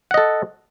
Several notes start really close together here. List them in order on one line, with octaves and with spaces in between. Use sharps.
F#5 D#5 A4